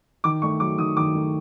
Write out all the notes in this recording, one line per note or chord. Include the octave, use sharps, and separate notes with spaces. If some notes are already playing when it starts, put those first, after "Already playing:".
D#3 D6
A3 C#6
F#3 D6
D#3 D#6
D#3 D6
A3